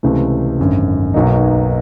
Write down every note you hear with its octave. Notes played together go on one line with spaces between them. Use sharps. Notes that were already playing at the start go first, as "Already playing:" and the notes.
C#2 C3 E3 A3
G#1 F#2 D3
B1 B2 F#3 A#3 D#4